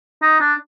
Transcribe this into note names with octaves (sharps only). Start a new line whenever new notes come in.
D#4
D4